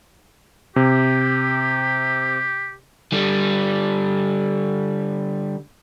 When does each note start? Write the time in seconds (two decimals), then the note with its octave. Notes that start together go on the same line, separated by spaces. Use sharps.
0.76 C3 G4
3.12 D3 G3